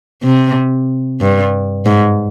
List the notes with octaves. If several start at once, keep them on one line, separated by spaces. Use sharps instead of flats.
C3
G2
G#2